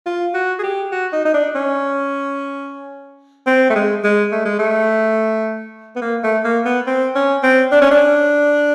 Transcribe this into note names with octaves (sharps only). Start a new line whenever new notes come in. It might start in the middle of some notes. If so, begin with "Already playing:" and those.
F4
F#4
G#4
G4
F#4
D#4
D#4
D4
C#4
C4
A3
G#3
G#3
A3
G#3
A3
B3
A#3
A3
A#3
B3
C4
C#4
C4
D4
C#4
D4